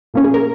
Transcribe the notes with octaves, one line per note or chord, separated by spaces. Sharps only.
A#2 F3 A#3 C#4
G#4
A#4